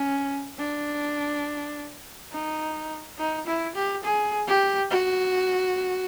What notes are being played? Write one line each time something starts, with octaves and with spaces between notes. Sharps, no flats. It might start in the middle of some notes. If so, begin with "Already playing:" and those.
Already playing: C#4
D4
D#4
D#4
E4
G4
G#4
G4
F#4